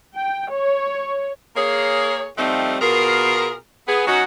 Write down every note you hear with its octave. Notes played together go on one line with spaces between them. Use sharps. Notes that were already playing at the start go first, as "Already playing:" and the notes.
G5
C#5
A#3 G#4 C#5
F2 F3 G3 A3 C4 D#4
B2 F4 G#4 A#4
B3 G#4
F#3 C#4 D#4 F#4